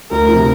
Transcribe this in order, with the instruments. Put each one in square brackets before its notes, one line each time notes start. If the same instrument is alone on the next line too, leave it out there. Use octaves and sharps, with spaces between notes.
[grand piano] D2 [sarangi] A#4
[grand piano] C3 F3